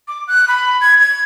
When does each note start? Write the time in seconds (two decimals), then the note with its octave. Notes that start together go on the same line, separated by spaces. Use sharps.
0.08 D6
0.28 F#6
0.48 B5
0.81 G#6
1.00 G#6